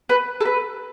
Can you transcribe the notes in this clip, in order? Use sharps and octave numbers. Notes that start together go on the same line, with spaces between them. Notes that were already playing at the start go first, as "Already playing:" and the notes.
B4
A4
B4